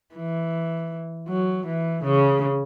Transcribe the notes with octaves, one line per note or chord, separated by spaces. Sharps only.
E3
F#3
E3
C#3